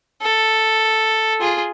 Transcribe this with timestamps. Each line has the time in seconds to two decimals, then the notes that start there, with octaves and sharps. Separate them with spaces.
0.22 A4
1.40 F4 G#4